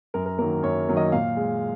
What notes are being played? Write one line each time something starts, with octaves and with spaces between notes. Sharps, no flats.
F#2 A#4
A#4
D#3 F#3 A#3 A#4
F#2 C#5
D#3 F#3 A#3
D#5
A#2 F5
G#3